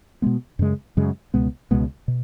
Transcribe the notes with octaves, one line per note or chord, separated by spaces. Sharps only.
B2 G#3 B3
F#2 C#3 G#3
F#2 C#3 G#3
C#2 B2 G#3 B3
C#2 B2 G#3 B3
B2